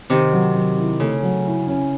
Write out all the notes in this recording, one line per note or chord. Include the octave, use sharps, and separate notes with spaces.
C3 D#3 C4
F#3
F#3
E4
C#3 A3
F#3
E4
C#4